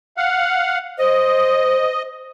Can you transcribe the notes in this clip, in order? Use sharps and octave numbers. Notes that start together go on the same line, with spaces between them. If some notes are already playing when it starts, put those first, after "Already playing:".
F5 F#5
C5 D#5